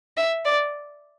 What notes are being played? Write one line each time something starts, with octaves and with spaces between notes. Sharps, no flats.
E5
D5